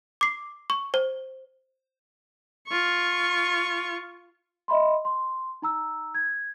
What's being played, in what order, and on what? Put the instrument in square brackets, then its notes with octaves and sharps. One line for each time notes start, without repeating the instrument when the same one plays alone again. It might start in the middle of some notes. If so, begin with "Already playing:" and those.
[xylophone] D6 C7
C#6
C5
[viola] F4 C#6
[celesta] D#5 E5 B5 C6
C6
D#4 A#5 E6
G#6